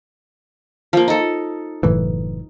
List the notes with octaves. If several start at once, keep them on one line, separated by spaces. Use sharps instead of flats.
F3 A#3
D#4 A4
F#1 A2 E3